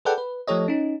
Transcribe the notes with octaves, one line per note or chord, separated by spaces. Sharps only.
G#4 A4 B4 D5 F#5 G5
B4
F3 A3 G4 A4 C#5 D#5
C#4 D#4